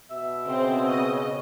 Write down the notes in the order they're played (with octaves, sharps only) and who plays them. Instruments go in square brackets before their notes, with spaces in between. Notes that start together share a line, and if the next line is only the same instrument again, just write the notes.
[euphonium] B2 [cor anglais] E5
[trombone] C#3 [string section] C4
[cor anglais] F#4 [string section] D#5